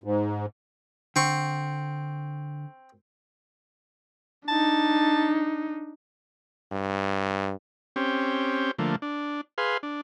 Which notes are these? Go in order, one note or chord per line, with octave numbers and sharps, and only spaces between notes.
G#2
D3 C4 C#6
D4 D#4 A5
G2
C4 C#4 G4
D3 F3 A3 A#3
D4
G#4 B4 F5 C6
D4